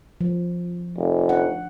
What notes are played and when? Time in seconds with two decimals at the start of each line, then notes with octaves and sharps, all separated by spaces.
0.21 F3
0.97 F1
1.29 D4 F#5